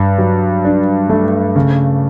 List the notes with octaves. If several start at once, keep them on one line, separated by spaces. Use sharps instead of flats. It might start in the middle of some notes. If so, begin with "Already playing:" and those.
Already playing: G2
F#3
D4
A3
C#3